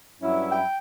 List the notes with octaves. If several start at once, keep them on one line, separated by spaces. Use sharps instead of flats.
G2 F#3 C#4 E4
G5